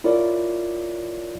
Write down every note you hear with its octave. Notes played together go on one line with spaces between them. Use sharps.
E4 F4 A#4 C#5 D5